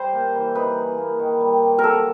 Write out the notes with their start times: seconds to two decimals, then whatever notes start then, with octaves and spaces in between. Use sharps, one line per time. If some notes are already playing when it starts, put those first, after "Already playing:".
Already playing: G3 C5
0.13 A#3
0.35 E3
0.55 D#4 B4
0.78 G#4
0.98 A#3
1.19 D#3
1.40 G3
1.62 C3
1.79 A#4
1.84 F#3 A4